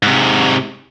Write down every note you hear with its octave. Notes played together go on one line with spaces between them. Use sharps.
G#2 C3